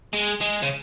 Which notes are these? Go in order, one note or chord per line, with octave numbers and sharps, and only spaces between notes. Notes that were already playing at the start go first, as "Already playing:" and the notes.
G#3
G#3
C#3